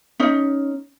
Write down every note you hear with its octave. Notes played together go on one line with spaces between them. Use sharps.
C#4 D#4